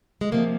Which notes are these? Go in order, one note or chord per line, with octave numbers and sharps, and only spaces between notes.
G#3
C3 F3 A#3